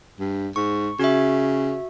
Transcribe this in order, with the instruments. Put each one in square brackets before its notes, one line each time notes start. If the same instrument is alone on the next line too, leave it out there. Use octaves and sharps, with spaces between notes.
[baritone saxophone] G2
[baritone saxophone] G#2 [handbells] C#6
[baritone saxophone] C#3 [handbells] F#4 E5